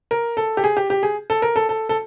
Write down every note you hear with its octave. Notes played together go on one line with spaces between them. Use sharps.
A#4
A4
G4
G#4
G4
G4
G#4
A4
A#4
A4
A4
A4